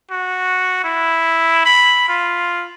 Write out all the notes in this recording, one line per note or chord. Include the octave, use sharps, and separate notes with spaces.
F#4
E4
B5
F4